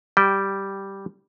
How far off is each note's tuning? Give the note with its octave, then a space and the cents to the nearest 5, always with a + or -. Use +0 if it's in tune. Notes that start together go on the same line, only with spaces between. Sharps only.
G3 -5 G5 -10